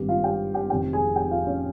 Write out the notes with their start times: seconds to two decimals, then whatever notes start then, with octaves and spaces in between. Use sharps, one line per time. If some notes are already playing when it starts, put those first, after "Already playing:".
Already playing: G#1 G2 G3 G4
0.09 F4 F5
0.24 G4 G5
0.54 G4 G5
0.70 F1 F2 C3 D#3 G4 G5
0.93 G#4 G#5
1.15 G4 G5
1.31 F4 F5
1.47 C#4 C#5